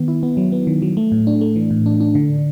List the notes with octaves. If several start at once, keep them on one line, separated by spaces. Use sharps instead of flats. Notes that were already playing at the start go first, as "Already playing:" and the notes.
Already playing: D#3 B3
E4
B3
F#3
B3
D#3
F#3
A3
A2
D4
A3
E3
A2
D4
D4
D3